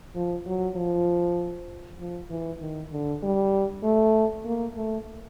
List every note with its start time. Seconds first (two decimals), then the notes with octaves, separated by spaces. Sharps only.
0.15 F3
0.46 F#3
0.76 F3
1.99 F3
2.30 E3
2.60 D#3
2.92 D3
3.23 G3
3.83 A3
4.45 A#3
4.76 A3